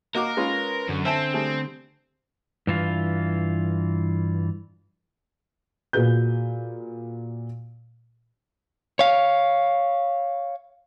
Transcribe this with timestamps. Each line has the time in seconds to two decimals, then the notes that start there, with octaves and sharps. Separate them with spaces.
0.15 A#3 F#4 A#4 D#5 D6
0.37 G#3 C#4 F4 B4
0.89 F#2 D3
1.05 C4 E5 G#5 A5
1.34 G3 A3 G#4
2.67 G2 E3 F4
5.93 A#2 F#4 G#4 B4 G6
8.99 C#5 F5